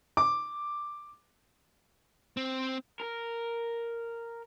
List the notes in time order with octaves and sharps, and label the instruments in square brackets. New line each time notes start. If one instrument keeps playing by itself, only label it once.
[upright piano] D6
[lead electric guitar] C4
[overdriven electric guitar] A#4